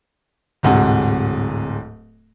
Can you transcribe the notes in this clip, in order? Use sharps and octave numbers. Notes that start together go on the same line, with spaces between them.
D1 G#2 C3 F#4